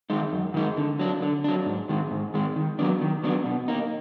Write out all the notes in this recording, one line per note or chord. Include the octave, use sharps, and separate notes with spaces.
D#3 G#3 D#4
F#2
D#3 G#3 D#4
D3
F#3 D4
D3
F#3 D4
G#2
D#3 G#3
G#2
D#3 G#3
D#3
F#3 B3 D4
D#3
F#3 B3 D4
B2
A#3 D#4